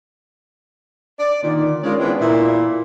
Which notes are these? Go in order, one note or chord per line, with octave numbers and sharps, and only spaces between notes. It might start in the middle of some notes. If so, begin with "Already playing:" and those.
D5
A#2 D3 D#3
G#3 C#4 F4 G#4 A#4 D5
E3 G#3 B3 C4 D4
A#2 E4